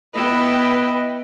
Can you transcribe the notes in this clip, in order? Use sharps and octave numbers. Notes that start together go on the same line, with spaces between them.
B3 E4 B4 D#5 G5